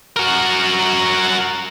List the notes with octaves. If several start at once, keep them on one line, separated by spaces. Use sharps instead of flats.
F#4 A#4